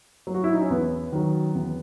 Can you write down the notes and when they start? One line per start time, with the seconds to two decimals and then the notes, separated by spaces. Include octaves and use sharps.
0.27 F#3
0.35 F#4
0.44 E4
0.53 D#4
0.61 C#4
0.70 E2 B3
1.13 D#3 F#3
1.55 E2